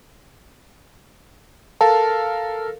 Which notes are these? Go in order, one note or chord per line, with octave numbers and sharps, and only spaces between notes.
A4 A#4 F5 A5